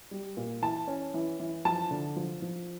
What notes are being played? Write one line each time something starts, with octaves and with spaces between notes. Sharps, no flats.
G3
A#2
E3 A5
C#4
E3
E3
F3 A5
D3
F3
F3